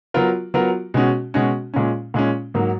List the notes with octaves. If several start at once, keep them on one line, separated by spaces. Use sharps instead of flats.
F#3 B3 F4 A#4
F#3 B3 F4 A#4
B2 G#3 C#4 F#4
B2 G#3 C#4 F#4
A#2 G#3 C#4
A#2 G#3 C#4
G#2 F#3 A#3